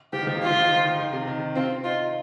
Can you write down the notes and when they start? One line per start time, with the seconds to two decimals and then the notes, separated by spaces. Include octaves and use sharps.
0.13 F3 G4
0.21 D#3
0.27 F3
0.35 A#3
0.41 G3 F4
0.50 F3
0.61 D#3
0.85 D#3
0.99 D#3
1.13 C3
1.27 D#3
1.55 C4 F4
1.84 D#4 F4